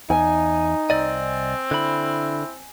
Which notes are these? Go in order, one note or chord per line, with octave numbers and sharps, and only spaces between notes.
E2 D#4 G#5
C2 C4 D5 D#5
D3 E4 B5